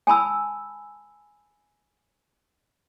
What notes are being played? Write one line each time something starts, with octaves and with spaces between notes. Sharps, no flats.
G#5 A5 B5 E6